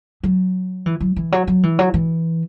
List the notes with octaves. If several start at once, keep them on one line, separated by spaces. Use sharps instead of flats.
F#3
E3
F#3
E3
F#3
F#3
E3
F#3
E3